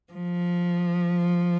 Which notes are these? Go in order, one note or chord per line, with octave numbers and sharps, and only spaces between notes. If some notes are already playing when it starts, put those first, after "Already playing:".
F3